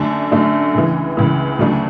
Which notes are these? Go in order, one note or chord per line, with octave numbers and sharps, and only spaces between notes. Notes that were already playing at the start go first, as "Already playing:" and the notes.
Already playing: F#2 D3 A3 D4
F#2 D3 A3 D4
C#2 C#3 E3
C#2 C#3 E3
D2 C#3 F#3 A3 D4